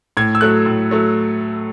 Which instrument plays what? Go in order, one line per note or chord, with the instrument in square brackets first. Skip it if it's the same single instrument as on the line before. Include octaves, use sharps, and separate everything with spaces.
[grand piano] A2 G#6
E6
F#3 A3 F#6
A2
F#3 A3